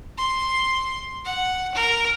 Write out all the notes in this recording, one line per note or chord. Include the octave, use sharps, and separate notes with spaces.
C6
F#5
A#4